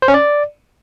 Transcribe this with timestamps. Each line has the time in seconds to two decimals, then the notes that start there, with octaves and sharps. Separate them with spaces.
0.02 C5
0.08 C#4
0.14 D5